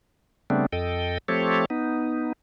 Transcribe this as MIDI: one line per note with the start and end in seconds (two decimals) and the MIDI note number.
0.50 0.66 49
0.50 0.66 55
0.50 0.66 57
0.50 0.66 59
0.50 0.66 60
0.50 0.66 62
0.72 1.18 41
0.72 1.18 69
0.72 1.18 75
0.72 1.18 79
1.28 1.65 53
1.28 1.65 57
1.28 1.65 60
1.28 1.65 67
1.28 1.65 69
1.28 1.65 73
1.70 2.33 59
1.70 2.33 63